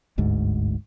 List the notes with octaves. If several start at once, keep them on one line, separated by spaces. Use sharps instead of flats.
G1 D2 G#2